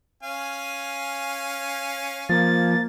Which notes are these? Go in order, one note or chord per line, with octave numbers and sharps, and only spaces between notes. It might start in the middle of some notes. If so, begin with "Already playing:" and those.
C#4 F5 G#5
F3 A#3 A6